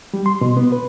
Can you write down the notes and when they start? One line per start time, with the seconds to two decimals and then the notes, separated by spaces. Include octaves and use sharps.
0.14 G3
0.26 C6
0.41 B2
0.57 B3
0.72 B4